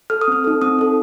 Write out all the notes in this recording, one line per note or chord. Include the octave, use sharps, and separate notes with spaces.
A4 F6
D#6
C4 F6
D#4 A4
C4 D#6
D#4 A4